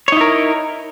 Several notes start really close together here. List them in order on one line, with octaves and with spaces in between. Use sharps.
C#5 D#4 E4 A#4